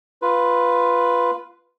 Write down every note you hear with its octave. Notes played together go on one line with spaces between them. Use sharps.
F4 B4